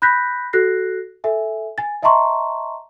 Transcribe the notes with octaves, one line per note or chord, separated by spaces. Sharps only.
B5 F#6 G6 A#6 B6
F#4 A4 F#6 A#6 C7
A4 E5 G#5
G#5 A6
D#5 E5 A5 A#5 C6 C#6